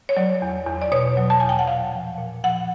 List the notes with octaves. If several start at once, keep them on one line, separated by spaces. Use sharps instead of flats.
C#5
F#3 D5
E2
E2
D5
B2 C#5
F#3
A5
E2 G#5
G5
F#5
A#2 F5
F3
A#2
F3 F#5